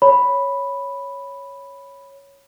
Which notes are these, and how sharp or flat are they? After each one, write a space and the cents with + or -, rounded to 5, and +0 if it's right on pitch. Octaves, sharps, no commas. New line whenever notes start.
C#5 +0 B5 +0